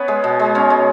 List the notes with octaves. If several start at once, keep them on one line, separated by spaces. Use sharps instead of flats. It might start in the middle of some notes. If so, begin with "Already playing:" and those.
Already playing: B3 C#4 B4 C#5
G#3
B2
G#3
B2 C#4 C#5
G#3